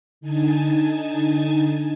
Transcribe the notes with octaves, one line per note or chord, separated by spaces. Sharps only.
D3 D#4 G#5 A5 G#6